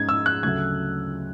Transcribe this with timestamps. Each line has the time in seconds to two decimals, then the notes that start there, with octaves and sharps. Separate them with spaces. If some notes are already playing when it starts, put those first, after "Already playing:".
Already playing: G#2 G#3 C#4 G#6
0.09 E6
0.26 F#6
0.43 D2 C#3 F#3 A3 G#6